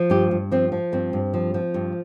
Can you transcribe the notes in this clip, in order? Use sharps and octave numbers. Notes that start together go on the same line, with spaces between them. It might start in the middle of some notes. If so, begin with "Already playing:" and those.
Already playing: F3
G2 G4
G2
F3 C4
F3
G2 C4
G2
F3
F3
G2